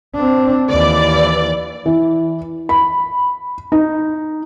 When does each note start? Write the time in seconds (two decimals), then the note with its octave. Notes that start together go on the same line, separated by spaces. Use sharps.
0.15 C4 D4
0.70 D#2 E3 D5
1.86 E3
2.69 B5
3.72 D#4